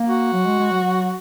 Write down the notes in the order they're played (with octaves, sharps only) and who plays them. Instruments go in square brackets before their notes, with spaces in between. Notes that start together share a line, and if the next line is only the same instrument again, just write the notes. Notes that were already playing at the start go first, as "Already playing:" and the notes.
Already playing: [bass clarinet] A#3
[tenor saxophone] F#4
[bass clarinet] F#3
G#3
G#3
F#3
F#3